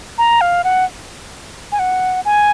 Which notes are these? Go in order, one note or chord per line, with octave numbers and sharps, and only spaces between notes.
A#5
F5
F#5
G#5
F#5
G#5